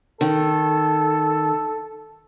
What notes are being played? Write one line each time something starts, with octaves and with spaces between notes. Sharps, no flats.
D#3 A4